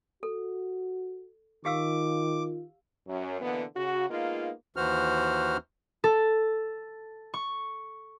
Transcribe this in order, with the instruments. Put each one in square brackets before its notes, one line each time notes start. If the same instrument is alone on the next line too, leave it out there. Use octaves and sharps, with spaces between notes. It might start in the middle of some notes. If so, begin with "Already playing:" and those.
[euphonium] F#4 [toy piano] A4
[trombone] D#3 [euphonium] F4 [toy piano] G4 F5 E6 [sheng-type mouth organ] D6
[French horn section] F#2
B2 D3 E3 A#3 B3
C#3 F#4
G#3 A#3 B3 D#4 F4
[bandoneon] D#2 E3 F#4 C5 F6
[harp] A4
C#6